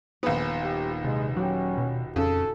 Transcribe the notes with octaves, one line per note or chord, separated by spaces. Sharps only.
D#1 A#1 B3 G#4
G4
C3 G#3 A6
F#3 C#4 F#4 G4
B2
F2 C#3 A4